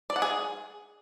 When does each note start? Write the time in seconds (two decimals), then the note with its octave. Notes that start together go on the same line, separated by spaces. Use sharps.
0.10 D5
0.16 F#5
0.22 G#4